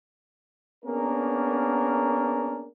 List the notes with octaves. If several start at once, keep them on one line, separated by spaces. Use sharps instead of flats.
A#3 B3 C#4 D4 G#4 A#4